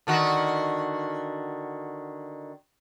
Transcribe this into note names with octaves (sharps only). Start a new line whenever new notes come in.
D3 D#3 F#4